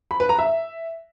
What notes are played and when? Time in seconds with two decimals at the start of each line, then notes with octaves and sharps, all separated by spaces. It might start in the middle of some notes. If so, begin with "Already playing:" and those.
0.11 B5
0.20 B4
0.29 A#5
0.39 E5